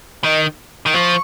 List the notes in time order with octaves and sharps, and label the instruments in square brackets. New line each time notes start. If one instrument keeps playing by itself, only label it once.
[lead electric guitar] D#3 [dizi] D#5
[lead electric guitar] D#3
[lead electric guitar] F3 [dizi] C#6